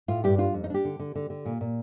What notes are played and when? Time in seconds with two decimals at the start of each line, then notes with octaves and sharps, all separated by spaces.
0.08 A2 F4
0.24 G2 G4
0.38 D4 F4
0.54 F2
0.64 D#4
0.70 D4 G4
0.85 D3
0.99 D3
1.15 D3
1.30 D3
1.45 A#2
1.61 A#2